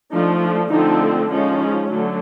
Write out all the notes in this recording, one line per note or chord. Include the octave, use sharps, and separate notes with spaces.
F3 A3 D4 D#4
D4
D3 F3 A3 C4 D#4
F3 G#3 C#4 D#4
D3 F#3 A3